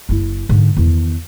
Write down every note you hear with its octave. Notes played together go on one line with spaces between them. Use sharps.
F#1 E4
G#2 D3
E2 D#3